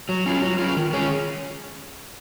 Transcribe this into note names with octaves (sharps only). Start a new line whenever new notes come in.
F#3
C#4 F4
F#3
C#4 F4
D#3
G#3 C#4 G#4 C#5